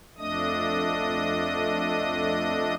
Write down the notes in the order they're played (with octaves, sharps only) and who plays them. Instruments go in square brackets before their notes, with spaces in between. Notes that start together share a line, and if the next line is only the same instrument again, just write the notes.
[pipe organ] F2 A3 D4 D#5 D#6